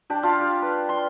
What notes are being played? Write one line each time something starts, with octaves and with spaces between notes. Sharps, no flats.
D4 G4
D4 F4 F5
G4
B4
C6